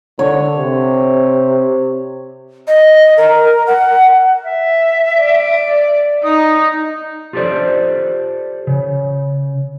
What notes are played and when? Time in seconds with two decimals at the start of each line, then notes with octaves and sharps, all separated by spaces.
0.19 D3 C#5
0.57 C3
2.68 D#5
3.17 A#4
3.67 F#5
4.44 E5
5.19 D5
6.24 D#4 D#6
7.33 F4 G4 A4 C5 D5
8.67 C#3